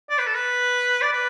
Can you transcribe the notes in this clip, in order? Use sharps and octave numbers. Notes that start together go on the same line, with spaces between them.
D5
B4
A4
B4
D5
B4